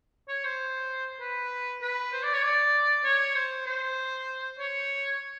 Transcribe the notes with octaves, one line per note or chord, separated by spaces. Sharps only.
C#5
C5
B4
B4
C5
D5
C#5
D5
C#5
C5
C5
C#5